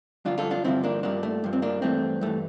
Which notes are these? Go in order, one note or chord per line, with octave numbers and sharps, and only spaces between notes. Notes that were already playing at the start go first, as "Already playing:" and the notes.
G2 D3 F3 D4 F4
F4 A4
D4 F4
G2 D3 F3 C4 E4
A#3 D4
G2 F3 A#3 D4
A3
G2 F3
C4
A#3 D4
G2 E3 A3 C4
G2 E3 A3